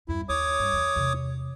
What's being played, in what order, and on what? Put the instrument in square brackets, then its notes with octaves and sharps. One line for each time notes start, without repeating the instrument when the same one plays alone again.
[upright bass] E2 G2 [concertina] E4
[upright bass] D#2 [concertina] C#5 D6 D#6
[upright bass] G2
E2 E3
E2 C3